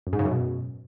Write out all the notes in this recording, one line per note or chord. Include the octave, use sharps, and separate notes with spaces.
F#2
G#2
C#3
F#2
B2